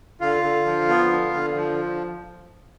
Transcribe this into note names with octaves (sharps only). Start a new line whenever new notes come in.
D3 F4 F5
D3
F3
B3
D3
D3
F3